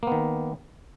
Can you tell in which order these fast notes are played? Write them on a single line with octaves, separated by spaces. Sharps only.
A#3 B3 D#3